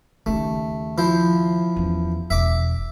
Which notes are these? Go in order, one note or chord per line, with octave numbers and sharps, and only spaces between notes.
D#2 C#3 A3
F3 E4 C5
E2 C#4
E1 E5 D6